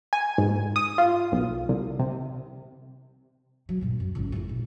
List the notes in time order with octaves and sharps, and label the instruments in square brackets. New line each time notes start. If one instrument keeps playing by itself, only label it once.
[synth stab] G#5
G#2
D#6
F4
B1
C2
C3
[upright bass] F#3
G2 A#2
F#2
G#1 C#2
F2 E4
A#1